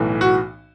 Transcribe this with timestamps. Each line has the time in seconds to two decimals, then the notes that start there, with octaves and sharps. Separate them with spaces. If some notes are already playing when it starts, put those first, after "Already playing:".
Already playing: B1 A2 E3
0.21 F#4